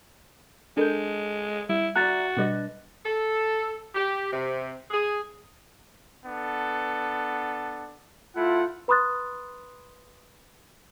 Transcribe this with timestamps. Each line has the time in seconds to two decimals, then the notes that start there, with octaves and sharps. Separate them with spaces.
0.77 G#3 D4 A4 A#4 G6
1.69 G3 E4
1.96 F#4 D5 E5 A#5 F#6 A6
2.37 B2 G3 D4 B4 D#5
3.05 A4
3.95 G4
4.33 C3
4.90 G#4
6.26 B3 D4 A4
8.35 A3 E4 F4 F#5
8.88 B4 B5 C6 D#6 F#6 A6